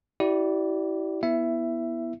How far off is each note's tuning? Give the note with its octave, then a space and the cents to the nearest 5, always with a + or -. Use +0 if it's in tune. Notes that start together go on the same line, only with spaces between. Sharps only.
E4 -15 G4 -40 D5 +0
B3 -15 E4 +0 E5 +15